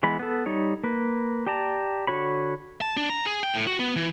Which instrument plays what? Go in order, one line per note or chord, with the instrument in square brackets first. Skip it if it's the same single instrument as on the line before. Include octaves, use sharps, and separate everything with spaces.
[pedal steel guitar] E3 G#3 B3 B5
B3 A4
G3 D#4 C#5
A#3 B4
G4 D5 A5 A#5
D3 F#4 C#5 B5
[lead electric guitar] A5
D4
A#5
G#4
G5
A2
F#4
B3
E3